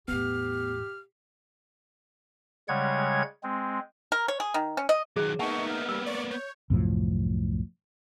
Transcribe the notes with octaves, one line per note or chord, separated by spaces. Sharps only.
E2 A2 B3 G4 F6
C#3 G3 G#3 C#5 F#5 G#6
G#3 C4
A#4
C#5
G#4
D#3
C#4
D#5
D#3 F#3 G#4 F#6
A#3 B3 D#4 E5 F#5 A5 C#6
F6
G3 E6
C#5 D5
C#5 G6
C2 F#2 A2 F3